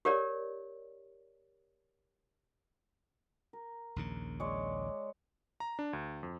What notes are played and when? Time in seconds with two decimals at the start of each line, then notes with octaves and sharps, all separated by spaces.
0.05 G4 A#4 C#5 D5
3.53 A#4
3.96 A#1 D#2 C#3
4.40 G#3 C#5 D5
5.60 A#5
5.79 D4
5.93 D2
6.23 F2